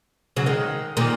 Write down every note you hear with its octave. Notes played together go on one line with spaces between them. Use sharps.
C#3 F#3
D#3 G#3
A#2 D#3